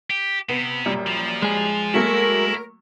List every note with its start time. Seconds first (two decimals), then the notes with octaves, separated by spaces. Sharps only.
0.10 G4
0.49 C3 B3
0.86 F#2 A#2 G3
1.07 F3
1.42 G#3 G#4
1.94 F#3 A3 A#3 E4 A#4